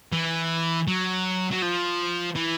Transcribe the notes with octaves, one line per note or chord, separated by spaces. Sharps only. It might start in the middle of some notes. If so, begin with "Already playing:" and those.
E3
F#3
F#3
F3
E3